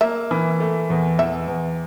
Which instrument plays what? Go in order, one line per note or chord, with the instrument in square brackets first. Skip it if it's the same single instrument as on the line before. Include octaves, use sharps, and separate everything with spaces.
[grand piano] A#3 [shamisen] E5
[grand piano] E3
A3
E2
[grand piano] E2 [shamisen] E5
[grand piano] E2